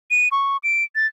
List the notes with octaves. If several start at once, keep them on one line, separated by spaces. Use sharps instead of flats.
D#7
C#6
D7
A6